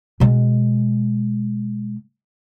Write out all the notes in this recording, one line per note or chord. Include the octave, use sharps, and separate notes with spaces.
B2 G#3